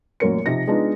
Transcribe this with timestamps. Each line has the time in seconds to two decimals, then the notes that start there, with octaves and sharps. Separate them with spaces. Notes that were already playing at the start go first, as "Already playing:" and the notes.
0.20 A1 F#2 A#2 A#4 C#5 C#7
0.46 C3 F3 D#4 A#6
0.67 G#3 B3 D4 D#4 F4